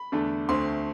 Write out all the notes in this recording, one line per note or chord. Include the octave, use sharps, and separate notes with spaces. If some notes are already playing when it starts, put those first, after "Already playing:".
Already playing: B5
E2 D3 A3 D4
D2 D3 A3 C4 C6